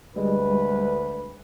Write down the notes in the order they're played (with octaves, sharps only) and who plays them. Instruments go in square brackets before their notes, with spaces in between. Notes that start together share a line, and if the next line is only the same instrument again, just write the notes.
[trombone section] D2 B4 [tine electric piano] G3 G#3